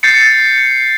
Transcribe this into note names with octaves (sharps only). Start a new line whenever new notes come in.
G6 A6 C7 C#7